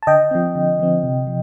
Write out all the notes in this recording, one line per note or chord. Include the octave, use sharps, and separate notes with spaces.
A5
D3 D#5 G5
F3 C4
D3
F3 C4
C3
F3